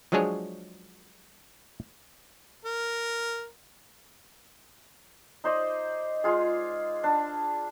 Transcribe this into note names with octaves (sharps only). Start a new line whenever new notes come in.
F3 F#3 G#3 D4 G#4 C#5
A#4
D#4 C5 D5 D#5
G#3 F4 G#4
D4